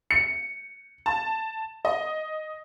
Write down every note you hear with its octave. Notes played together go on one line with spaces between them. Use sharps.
C#7
A5
D#5